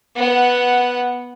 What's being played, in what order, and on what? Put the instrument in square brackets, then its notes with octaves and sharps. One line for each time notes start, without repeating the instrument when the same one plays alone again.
[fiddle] B3 F#5